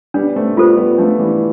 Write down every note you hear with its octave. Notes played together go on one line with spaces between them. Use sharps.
G3 B3 D4
A3 C4
G3 B3 F4 A4 C5
G3 B3
F3 A3 D4
E3 G3